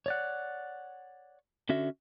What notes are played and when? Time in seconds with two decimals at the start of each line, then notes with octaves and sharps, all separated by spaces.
0.06 C#5 D5 F#5
1.69 D3 C#4 F#4 E5